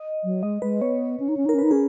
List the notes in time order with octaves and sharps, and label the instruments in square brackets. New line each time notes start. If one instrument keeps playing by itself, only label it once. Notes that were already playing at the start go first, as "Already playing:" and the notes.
Already playing: [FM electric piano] D#5
[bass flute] F#3
[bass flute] G#3 [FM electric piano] D#5
[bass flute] G#3 [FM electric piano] B4
[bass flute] B3 [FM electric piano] C#5
[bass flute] C#4
D#4
C#4
[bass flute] D#4 [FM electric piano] A#4
[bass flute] C#4
[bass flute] D#4 [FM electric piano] B4
[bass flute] C#4 [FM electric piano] G#4